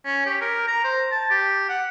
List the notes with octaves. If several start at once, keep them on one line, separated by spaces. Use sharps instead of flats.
C#4
G4
A#4
A#5
C5
A5
G4
F#5